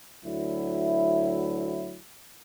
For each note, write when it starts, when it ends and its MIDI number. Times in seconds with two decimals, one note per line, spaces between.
0.24 1.98 38
0.24 1.98 54
0.24 1.98 64